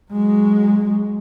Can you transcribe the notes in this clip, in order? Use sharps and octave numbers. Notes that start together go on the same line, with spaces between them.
F#3 G#3